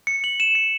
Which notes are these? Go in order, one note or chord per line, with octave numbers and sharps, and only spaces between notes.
C#7
F#7
E7
C#7